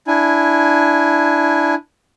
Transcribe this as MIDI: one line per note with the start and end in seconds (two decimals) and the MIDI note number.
0.07 1.75 62
0.07 1.75 64
0.07 1.75 80